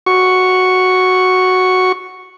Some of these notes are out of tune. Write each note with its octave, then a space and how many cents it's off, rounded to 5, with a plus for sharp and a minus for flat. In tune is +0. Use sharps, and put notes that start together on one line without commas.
F#4 +0 C#6 +0